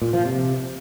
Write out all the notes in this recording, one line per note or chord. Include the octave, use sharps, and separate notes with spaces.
A#2
F3
C3